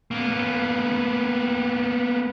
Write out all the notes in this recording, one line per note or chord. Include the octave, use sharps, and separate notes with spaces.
A#3 B3